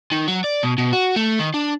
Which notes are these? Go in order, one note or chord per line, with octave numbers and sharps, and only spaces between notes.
D#3
F#3
D5
B2
B2
F#4
A3
D#3
D4